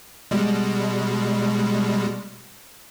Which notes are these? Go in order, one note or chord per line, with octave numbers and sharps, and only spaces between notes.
B2 G3 G#3